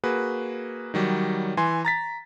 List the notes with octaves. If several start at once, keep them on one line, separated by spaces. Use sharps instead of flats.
A#3 F#4 G#4 B4
D#3 F#3 G3
E3 G#5 C6
A#5 A6 B6